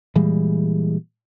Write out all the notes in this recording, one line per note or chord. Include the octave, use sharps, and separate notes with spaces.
A#2 E3 G3 G#3